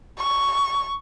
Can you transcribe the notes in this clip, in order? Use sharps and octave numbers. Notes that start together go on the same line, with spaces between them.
C#6